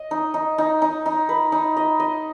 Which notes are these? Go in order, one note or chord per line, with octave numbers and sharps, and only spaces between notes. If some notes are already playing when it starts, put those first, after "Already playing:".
Already playing: D#5
D#4
D#4
D#4
D#4
D#4
B4
D#4
D#5
D#5